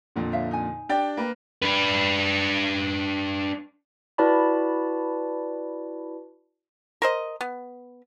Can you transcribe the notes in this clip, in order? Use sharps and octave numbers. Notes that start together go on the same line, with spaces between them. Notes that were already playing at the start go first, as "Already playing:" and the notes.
F2 A#2 D3
C#5 E5 F5
D#4 G#5
D4 G4 D5 G5
A#3 B4
D4 B4
E4 F#4 B4 D5 A5 B5
A#4 C5 D#5
B3